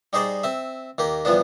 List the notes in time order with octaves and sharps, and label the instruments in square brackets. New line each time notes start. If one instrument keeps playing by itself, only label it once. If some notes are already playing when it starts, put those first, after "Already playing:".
[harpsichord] G3 D#4 G#4 C5 D5
C4 E5
D#2 A#3 G4
E2 F3 G3 B3 D4